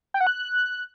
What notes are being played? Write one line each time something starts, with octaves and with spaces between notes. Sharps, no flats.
G5
F#5
F#6